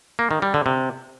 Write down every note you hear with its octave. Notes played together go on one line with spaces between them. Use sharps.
A#3
D#3
G3
D3
C3